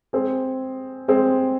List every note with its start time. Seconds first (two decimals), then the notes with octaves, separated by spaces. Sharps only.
0.13 G#3 C4 G#4
1.08 G#3 C4 G#4